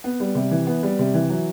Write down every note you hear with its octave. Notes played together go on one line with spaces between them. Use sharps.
B3
G3
C3
E3
B3
G3
C3
E3
F#3